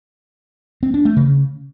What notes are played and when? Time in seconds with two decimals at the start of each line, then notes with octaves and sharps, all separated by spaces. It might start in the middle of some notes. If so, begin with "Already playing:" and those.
0.83 C4
0.94 D4
1.05 A3
1.17 C#3